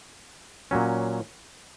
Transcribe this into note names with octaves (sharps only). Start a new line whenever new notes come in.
A#2 F#3 C#4